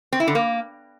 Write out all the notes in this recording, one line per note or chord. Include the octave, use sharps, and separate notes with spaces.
C4
E4
D3
A#3